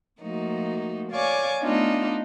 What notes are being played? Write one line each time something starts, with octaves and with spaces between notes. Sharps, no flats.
F3 A3 A#3 D#4 F#4
C#5 D5 F5 G#5 C#6 D6
A3 B3 D4 D#4 F4